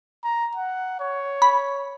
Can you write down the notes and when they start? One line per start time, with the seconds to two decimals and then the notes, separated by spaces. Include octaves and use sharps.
0.24 A#5
0.55 F#5
1.00 C#5
1.42 B5